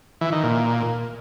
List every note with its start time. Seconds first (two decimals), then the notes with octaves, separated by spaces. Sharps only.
0.21 E3
0.32 D#3
0.43 A#2